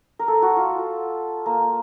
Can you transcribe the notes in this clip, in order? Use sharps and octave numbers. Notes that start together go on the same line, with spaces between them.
A#4
A4
F#4
F4
A#3